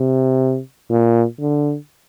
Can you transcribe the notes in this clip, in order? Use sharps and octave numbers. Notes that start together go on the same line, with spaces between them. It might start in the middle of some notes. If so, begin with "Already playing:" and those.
Already playing: C3
A#2
D3